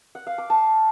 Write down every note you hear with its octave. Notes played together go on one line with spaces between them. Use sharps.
F#5
F5
D6
A5